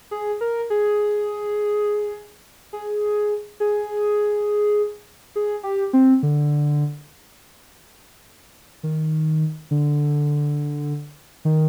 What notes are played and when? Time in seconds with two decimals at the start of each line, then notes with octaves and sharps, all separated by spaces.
0.11 G#4
0.41 A#4
0.70 G#4
2.73 G#4
3.60 G#4
5.36 G#4
5.63 G4
5.93 C4
6.23 D3
8.83 D#3
9.71 D3
11.45 D#3